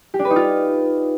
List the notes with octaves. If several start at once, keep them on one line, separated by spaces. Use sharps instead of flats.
G4
D4
B4
D#4
F4